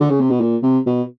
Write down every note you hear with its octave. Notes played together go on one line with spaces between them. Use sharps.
D3
C#3
C3
B2
A#2
C3
B2